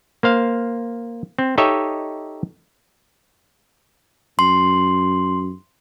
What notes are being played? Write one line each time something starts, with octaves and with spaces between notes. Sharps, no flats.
A#3 C5 F5
C4
D#4 G4 A4 C#5 D#5 E5
F#2 C6